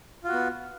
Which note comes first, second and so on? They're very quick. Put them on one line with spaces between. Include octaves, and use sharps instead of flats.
F4 F#4 B3